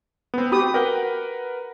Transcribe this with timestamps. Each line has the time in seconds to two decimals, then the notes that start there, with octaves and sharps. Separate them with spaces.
0.34 B3 C4
0.52 F#4 G4 B5 D#6
0.74 A#4 B4 F#5 G5